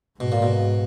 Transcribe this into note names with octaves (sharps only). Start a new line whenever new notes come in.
G#2 B2
A#2
B2